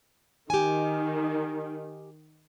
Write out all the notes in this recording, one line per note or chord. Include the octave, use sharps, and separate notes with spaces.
D#3 G4 G#5